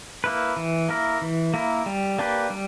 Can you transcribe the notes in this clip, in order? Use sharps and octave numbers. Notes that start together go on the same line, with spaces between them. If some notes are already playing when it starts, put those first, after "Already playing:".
A#3 E4 B4
E3
A#3 E4 A#4
E3
A#3 E4 A#4
G3
A#3 D4 G4 B4
G3